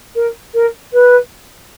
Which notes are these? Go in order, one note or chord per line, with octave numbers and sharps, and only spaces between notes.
A#4
A#4
B4